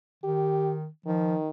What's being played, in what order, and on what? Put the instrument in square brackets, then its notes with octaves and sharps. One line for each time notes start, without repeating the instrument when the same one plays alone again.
[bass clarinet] D#3 [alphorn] G4
[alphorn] D#3 [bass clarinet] F3